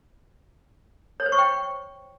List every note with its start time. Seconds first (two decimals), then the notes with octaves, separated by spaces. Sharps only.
1.20 C#5
1.26 C5
1.32 C#6
1.38 G5